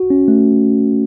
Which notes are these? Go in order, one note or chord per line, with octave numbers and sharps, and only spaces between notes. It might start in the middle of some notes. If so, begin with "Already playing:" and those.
Already playing: F#4
C#4
A3